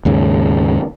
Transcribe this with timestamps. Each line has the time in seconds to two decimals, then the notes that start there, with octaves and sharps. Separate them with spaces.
0.05 D#2 G#2 C#3